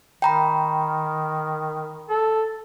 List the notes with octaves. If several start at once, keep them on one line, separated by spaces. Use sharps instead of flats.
D#3 G5 A#5 B5
A4